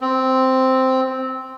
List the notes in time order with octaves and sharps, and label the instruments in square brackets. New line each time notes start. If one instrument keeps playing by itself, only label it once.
[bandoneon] C4